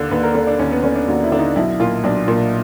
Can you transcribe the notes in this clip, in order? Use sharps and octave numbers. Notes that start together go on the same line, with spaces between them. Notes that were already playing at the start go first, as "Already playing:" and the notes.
Already playing: D#2 D3
D#2 B4
A#4
D3 A4
D4
D#2 C#4
B3
D3 C#4
D4
D#2 F#4
E4
D3 D4
D#4
B1 E4
A#2 F4
B1 D4
A#2